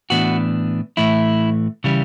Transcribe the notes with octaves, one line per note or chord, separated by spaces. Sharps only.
A2 E3 B3 D4 F#4
A2 E3 A3 E4
C#3 E3 G3